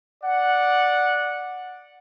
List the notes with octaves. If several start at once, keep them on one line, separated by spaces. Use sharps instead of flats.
D5 F#5